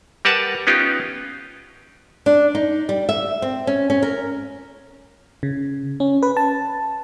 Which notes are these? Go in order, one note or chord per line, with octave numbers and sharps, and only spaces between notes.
G3 A#4 B4 F#5 A5
B3 C#4 D#4 F4 G4
D4
D#4
G3
E5
C4
C#4
C#4
A#4
C#3
C#4
B4
A5